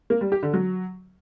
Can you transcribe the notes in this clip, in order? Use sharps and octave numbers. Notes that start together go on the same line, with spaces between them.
A#3
G3
G4
D3
F#3